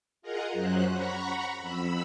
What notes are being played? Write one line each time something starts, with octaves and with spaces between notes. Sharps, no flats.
F4 G#4 A#4 D#5 F#5 A#5
F#2 F#3 C#4 C5 F#6
F#5 A#5 B5 C#6
F2 B5 E6